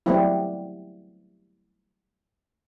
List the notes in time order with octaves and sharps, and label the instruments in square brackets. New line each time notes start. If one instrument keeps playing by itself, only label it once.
[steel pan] F#3 G3 A3 B3 C4 E4